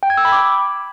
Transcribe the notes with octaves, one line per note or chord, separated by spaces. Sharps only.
G5
G#6
E6
B5
D6